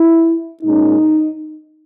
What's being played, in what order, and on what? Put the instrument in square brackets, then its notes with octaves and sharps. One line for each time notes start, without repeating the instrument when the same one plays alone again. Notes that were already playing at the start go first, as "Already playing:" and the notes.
Already playing: [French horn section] E4
A#2 G#3 C#4 D#4